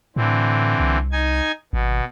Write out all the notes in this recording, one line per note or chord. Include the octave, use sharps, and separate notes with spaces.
A2 D3 E3 C4
C2
D#4 G#5 G#6
G#1 B2